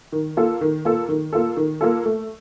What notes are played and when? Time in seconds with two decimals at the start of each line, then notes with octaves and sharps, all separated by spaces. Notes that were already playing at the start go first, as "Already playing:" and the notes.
0.12 D#3
0.37 A#3 F4 A4
0.61 D#3
0.85 A#3 F4 A4
1.09 D#3
1.33 A#3 F4 A4
1.57 D#3
1.81 A#3 F4 A4
2.06 A3